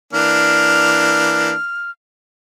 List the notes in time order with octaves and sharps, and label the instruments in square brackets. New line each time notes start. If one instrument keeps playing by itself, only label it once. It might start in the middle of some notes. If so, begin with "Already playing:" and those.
[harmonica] E3 A#3 D4 [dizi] F6